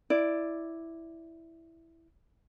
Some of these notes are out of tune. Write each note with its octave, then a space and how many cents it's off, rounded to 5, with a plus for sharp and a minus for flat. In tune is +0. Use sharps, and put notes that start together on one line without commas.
E4 +0 D5 +0